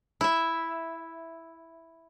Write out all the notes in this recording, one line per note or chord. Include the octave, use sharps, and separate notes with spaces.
E4 E5